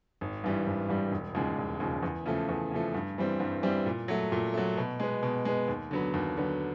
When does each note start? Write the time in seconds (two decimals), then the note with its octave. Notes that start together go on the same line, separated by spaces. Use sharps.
0.21 G#1
0.44 G2 E3 G3
0.67 G#1
0.89 G2 E3 G3
1.12 E1
1.35 D#2 C#3 F3 G#3
1.58 E1
1.80 D#2 C#3 F3 G#3
2.03 E2
2.26 C#3 F3 A3
2.49 E2
2.71 C#3 F3 A3
2.94 G2
3.18 E3 G3 C4
3.40 G2
3.63 E3 G3 C4
3.86 A#2
4.08 F#3 A3
4.32 A#2
4.54 F#3 A3
4.77 B2
5.00 G#3 B3
5.23 B2
5.45 G#3 B3
5.68 D#2
5.91 D3 F#3 B3
6.14 D#2
6.37 D3 F#3 B3